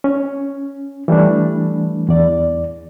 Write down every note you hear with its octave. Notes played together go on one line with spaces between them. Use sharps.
C#4
E3 G3 A3 D4
E2 D5